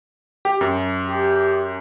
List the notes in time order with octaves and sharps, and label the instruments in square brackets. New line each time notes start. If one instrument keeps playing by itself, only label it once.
[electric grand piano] G4
F#2
[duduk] G4